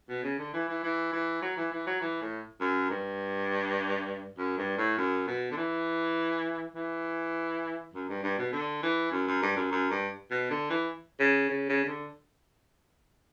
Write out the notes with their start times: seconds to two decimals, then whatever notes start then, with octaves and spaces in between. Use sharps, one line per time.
0.09 B2
0.24 C#3
0.39 D3
0.53 E3
0.68 E3
0.83 E3
1.13 E3
1.42 F#3
1.56 E3
1.72 E3
1.87 F#3
2.01 E3
2.21 A2
2.60 F#2
2.90 G2
4.38 F#2
4.58 G2
4.78 A2
4.97 F#2
5.27 B2
5.51 D3
5.57 E3
6.74 E3
7.94 F#2
8.09 G2
8.23 G2
8.38 B2
8.52 D3
8.82 E3
9.11 F#2
9.27 F#2
9.42 G2
9.56 F#2
9.71 F#2
9.90 G2
10.31 B2
10.50 D3
10.70 E3
11.19 C#3
11.49 C#3
11.69 C#3
11.84 C#3
11.88 D3